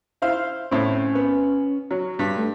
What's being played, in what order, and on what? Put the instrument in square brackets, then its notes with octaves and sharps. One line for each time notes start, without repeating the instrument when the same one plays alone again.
[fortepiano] E4 C5 F5
[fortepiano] A2 C4 [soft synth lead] C#4
[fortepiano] B3
F#3
[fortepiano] G2 [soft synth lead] B6
[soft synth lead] A3